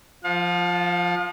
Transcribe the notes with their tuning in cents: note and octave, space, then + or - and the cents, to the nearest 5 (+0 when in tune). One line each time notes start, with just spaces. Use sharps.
F3 +0 F5 +40